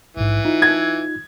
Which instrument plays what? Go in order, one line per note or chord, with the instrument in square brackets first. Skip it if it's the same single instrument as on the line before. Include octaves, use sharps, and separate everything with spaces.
[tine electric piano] A#1 G#2 [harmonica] E3
[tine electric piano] D#4 F4
[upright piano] G#6